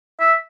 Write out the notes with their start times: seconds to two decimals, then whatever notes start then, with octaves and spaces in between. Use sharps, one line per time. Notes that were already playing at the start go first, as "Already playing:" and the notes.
0.20 E5